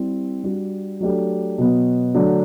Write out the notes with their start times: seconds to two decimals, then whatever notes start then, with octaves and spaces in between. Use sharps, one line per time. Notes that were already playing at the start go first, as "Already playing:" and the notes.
Already playing: G3 C4 E4
0.44 G3 D4 F#4
1.00 F#3 A3 D4 G4
1.58 B2 F#3 B3
2.14 D3 F#3 A3 D4